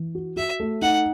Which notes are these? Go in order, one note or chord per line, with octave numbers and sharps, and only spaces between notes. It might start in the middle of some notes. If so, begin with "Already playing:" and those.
Already playing: E3
F#4
F#4 E5
A3
D#4 F#5